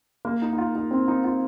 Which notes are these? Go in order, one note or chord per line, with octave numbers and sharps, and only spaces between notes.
A#3
D#4
D#4
F4
D#4
C4
D#4
F4